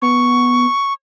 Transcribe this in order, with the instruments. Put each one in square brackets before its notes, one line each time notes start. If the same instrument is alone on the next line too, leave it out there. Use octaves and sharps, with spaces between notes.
[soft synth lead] B3 [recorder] C#6